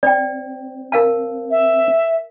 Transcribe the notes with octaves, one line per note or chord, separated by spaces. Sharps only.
C4 D5 G5
A#4 F5 A5
E5